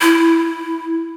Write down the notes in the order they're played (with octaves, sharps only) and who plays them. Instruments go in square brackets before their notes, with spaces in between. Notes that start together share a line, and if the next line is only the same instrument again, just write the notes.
[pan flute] E4